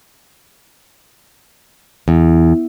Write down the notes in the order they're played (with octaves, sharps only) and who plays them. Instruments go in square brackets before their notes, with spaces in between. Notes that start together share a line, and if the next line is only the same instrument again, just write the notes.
[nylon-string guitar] E2